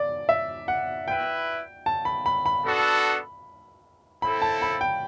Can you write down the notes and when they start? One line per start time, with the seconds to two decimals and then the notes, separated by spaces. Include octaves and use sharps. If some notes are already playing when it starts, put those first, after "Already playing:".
Already playing: D5
0.29 E5
0.68 F#5
1.07 E4 B4 E5 G5
1.86 A5
2.05 B5
2.26 B5
2.46 B5
2.65 B3 D4 F#4 A4
4.22 C4 E4 A4 B5
4.42 A5
4.62 B5
4.81 G5